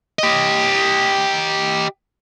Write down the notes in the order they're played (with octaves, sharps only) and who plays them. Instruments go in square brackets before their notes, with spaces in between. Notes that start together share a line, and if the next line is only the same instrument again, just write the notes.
[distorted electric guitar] G4 D#5